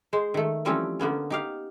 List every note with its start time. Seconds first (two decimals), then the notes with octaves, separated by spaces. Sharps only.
0.13 G#3 C5
0.34 D#3 A3
0.65 E3 F3 G3 A3 C4 C#4
0.99 D3 A#3 B3 C#4
1.30 D#4 G4 F5